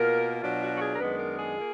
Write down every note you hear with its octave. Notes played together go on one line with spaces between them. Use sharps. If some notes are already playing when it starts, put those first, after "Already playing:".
Already playing: B2 A#3 F4 A#4
B2 F#3 D4 F4
F#4
F#4
G#4
A#4
F#2 D#3 G#3 B3 D4 B4
A#4
G#4
A#3 F4